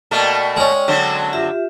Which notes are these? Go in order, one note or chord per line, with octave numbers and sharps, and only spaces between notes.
B2 A3 A#3 D5 G5
G#3 C#4
D3 F#3 C4
F4 G4 E5